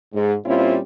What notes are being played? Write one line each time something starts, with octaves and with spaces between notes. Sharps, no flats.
G#2
A#2 G3 C4 C#4 E4 F4